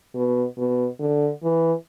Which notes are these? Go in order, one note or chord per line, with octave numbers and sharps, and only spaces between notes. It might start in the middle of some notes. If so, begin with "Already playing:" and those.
B2
B2
D3
E3